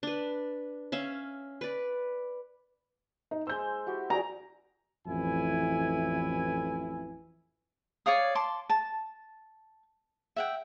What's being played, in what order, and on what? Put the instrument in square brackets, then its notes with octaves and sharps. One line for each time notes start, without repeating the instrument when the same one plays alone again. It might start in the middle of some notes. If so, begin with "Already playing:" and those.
[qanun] D4 B4
C#4 E5 F5
B4 D5
[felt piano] D#4
[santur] G#3 C5 [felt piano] E6 G6
[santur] E4 F#4 G4
[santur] F#4 G#4 G5 [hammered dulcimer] A#5
[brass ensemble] A1 F2 E3 E4 G#5
[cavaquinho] C#5 D5 F5 D#6
A5 C6 D6
A5
E5 F#5 G5